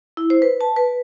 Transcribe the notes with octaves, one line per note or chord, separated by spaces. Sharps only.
E4
C5
B4
A5
B4